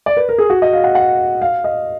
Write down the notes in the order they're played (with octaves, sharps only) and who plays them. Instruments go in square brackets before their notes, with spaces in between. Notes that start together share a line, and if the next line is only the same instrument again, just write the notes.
[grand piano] D5
B4
A#4
G#4
F#4
D#5
F5
F#5
F#5
F5
D#5